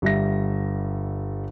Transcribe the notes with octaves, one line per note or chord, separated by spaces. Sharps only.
G1 G3 E5 A#6